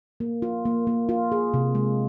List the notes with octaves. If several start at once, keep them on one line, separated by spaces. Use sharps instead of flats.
A#3
F4
A#3
A#3
F4
G#4
C3
G#3